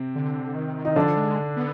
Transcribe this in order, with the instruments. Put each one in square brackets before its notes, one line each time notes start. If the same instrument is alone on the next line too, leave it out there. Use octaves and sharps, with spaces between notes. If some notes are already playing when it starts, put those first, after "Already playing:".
Already playing: [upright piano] C3 C4
[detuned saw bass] D3
D#3
[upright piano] D#4
[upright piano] D3 D4 [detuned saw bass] F3
[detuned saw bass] G#3
B3